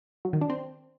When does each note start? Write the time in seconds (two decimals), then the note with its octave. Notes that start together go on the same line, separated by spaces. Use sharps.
0.25 F#3
0.33 D#3
0.41 D4
0.50 C4